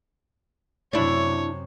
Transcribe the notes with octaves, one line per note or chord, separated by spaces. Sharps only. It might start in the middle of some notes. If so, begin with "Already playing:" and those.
F#2 C3 D4 E4 C#5